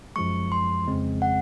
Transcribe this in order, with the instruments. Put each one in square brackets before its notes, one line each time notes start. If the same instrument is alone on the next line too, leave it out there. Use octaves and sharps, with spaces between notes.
[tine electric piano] F#2 F3 G#3 [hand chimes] C#6
[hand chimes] C6
[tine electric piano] F2 C#3 G#3 C4
[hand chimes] F#5